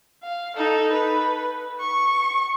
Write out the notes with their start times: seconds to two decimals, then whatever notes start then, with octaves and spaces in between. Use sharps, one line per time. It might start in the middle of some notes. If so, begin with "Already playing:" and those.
0.24 F5
0.56 D#4 A4
0.93 B4
1.80 C#6